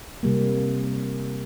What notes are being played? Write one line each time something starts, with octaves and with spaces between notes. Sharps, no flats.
C3 G3 A#3